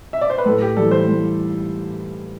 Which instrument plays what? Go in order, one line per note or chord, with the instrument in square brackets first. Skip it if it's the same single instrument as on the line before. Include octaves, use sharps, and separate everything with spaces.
[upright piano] E5
D5
C5
B4
[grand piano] A2 [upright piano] A4
[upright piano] G4
[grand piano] E3 G3 [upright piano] A4
[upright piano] C5
[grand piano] A2